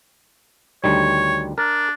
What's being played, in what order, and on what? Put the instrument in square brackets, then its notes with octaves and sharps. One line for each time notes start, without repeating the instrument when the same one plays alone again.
[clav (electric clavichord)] D2 D#3 G3 [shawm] C#5
[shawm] D4 [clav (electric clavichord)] A#4